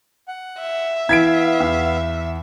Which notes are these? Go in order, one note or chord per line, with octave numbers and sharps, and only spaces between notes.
F#5
E5
E3 B3 F5 G#6 B6 D7
E2